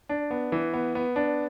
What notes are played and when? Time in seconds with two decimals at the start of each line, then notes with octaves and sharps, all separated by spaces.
0.09 D4
0.31 B3
0.52 E3
0.74 B3
0.95 B3
1.16 D4